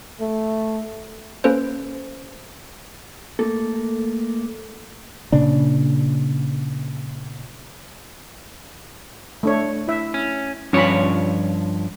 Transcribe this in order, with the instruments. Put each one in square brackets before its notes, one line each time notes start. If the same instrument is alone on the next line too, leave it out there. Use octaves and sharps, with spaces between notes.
[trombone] A3
[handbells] A#3 C#4 A4 B4 C5
[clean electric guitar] A3 A#3 A4
[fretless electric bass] A#2 C#3 D4
[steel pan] A3 D4 C#5
E4 E5
[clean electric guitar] C#4
[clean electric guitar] G2 F3 C#5 [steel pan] C#4 F4 B5